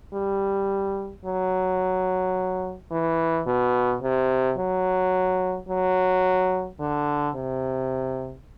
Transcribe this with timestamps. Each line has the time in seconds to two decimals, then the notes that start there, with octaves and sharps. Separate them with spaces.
0.14 G3
1.25 F#3
2.91 E3
3.46 B2
4.02 C3
4.58 F#3
5.68 F#3
6.79 D3
7.35 C3